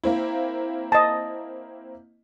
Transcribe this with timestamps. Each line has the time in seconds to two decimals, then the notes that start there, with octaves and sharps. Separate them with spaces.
0.03 A#3 C4 E4
0.92 D#5 A5